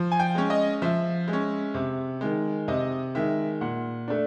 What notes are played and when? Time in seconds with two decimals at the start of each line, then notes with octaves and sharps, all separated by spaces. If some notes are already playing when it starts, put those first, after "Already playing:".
Already playing: F3
0.12 G#5
0.20 G5
0.35 G#3 C#4
0.50 D#5
0.82 F3 E5
1.28 G#3
1.33 C#4
1.74 C3
2.21 D#3 G#3
2.68 C3 D#5
3.15 D#3 G#3 E5
3.61 A#2 F#5
4.08 A3 D4